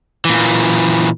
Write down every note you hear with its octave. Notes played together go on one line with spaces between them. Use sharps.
A#2 E3